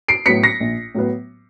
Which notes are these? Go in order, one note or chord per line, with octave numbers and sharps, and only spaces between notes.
C7 D7
A2 F#3 B3 B6 C#7
A#6 C7
A#1
A2 F#3 B3